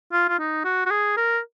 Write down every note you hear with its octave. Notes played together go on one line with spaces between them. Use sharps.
F4
F4
D#4
F#4
F#4
G#4
A#4